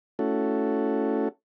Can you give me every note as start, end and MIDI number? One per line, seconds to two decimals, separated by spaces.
0.19 1.28 57
0.19 1.28 61
0.19 1.28 64
0.19 1.28 66
0.19 1.28 69